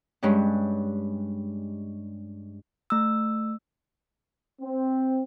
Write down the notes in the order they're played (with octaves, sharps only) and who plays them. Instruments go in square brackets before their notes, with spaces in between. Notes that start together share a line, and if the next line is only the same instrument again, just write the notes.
[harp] G2 G#3 C#4
[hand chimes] A3 E6
[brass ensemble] C4